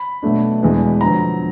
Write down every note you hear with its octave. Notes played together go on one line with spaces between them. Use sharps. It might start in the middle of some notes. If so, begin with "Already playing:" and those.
Already playing: B5
B2 F#3 A3 D4
E2 B2 G#3 B3 D4
F2 D3 F#3 A#5